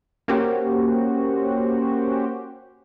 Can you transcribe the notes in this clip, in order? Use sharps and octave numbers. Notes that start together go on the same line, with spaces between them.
A#3 C#4 F#4 G4 C5